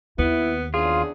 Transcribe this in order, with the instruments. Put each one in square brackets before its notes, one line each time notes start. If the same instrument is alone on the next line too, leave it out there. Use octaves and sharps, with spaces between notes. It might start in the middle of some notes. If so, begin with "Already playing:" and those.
[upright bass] D#2 [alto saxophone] B3 [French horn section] E4
[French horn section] E2 C#3 D4 [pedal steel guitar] F4 [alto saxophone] G#4